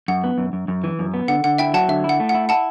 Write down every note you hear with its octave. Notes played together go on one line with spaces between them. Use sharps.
F#2 F#5
B3
F#2
F#2
F#2
E3
F#2
B3
D3 F#5
D3 F#5
E4 E5 G5
F#3 F#5 A5
D3 E5
E4
F#5
A3
F#5
E4
E4 F#5 A5